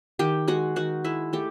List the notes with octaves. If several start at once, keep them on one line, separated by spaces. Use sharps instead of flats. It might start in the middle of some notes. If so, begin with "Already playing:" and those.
D#3 G4 G5
G#3 F#4 F#5
D#3 F#4 F#5
G#3 E4 E5
A3 G4 G5